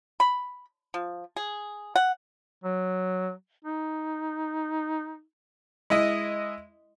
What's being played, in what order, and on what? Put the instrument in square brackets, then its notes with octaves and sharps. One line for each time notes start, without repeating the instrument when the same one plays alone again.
[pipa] B5
F3
G#4
F#5
[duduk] F#3
D#4
[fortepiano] G#3 E4 D#5